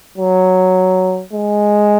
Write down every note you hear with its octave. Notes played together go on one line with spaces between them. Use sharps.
F#3
G#3